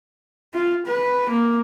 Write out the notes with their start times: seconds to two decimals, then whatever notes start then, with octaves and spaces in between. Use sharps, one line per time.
0.54 F4
0.86 B4
1.30 A#3